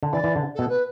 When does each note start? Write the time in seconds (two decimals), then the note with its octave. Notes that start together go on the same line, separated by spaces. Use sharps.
0.03 D3
0.12 E3 D5
0.24 E3
0.36 D3
0.55 B2 A4
0.69 B4